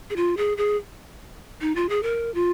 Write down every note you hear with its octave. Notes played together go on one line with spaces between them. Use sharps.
G#4
F4
G#4
G#4
D#4
F4
G#4
A#4
F4